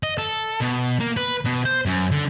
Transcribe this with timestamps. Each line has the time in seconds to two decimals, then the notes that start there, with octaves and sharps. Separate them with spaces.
0.03 D#5
0.18 A4
0.61 B2
1.00 A#3
1.17 B4
1.45 B2
1.65 C5
1.86 F#2
2.12 D3